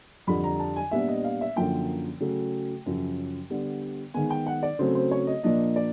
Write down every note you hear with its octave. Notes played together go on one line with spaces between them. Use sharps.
F2 D3 G3 B5
A#5
A5
G#5
A#2 G3 B3 D4 E5
D#5
F5
E5
F#2 D3 F3 A#3 G5
C#3 F#3 A3
F#2 C#3 F3
D3 G3 B3
D#3 G#3 B3 G#5
G5
F#5
D5
C#3 F#3 A3 C4 C5
C5
C#5
D#5
A#2 F3 A#3 D4 D#5
D5